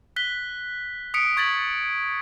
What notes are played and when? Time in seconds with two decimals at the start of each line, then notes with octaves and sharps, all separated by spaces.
0.16 F#6 B6 G7
1.14 D#6 B6 C#7 D7
1.37 C#6 G#6 A6 B6 F#7